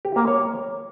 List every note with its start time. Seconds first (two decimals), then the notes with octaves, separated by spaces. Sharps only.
0.05 G4
0.16 A#3
0.27 C#5